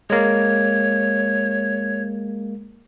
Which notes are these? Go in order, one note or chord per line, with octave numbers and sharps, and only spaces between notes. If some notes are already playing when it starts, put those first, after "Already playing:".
G#3 A#3 C#5